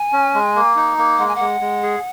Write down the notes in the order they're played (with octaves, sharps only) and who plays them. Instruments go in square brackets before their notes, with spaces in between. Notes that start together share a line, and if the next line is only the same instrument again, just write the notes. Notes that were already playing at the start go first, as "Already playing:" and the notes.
Already playing: [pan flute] G#5
[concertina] C#4
G#3
A#3
D#4
A#3
[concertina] G#3 [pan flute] F#5
[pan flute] G#5
[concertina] G#3 [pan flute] F#5
[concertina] G#3
G#4